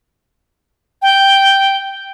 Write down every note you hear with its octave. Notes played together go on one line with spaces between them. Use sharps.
G5